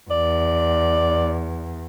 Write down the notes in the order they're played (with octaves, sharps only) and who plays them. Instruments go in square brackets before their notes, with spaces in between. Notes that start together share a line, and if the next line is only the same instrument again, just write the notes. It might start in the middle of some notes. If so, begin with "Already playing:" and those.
[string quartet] E2 [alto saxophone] D5